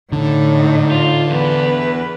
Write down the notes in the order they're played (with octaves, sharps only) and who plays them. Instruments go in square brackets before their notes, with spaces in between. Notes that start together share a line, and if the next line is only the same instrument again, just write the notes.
[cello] A2 D#4 [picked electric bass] D3
[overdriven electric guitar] F4
[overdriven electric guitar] E2 B3 [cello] B4